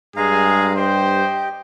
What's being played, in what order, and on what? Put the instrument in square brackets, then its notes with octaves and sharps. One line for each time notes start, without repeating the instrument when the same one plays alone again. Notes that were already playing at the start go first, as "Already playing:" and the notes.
[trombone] G2 [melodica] G#3 F5 A#5 [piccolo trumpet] G#4
[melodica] G4 D#5 [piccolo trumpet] C5 [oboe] G5